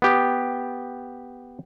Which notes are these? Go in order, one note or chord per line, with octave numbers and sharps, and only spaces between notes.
B3 G4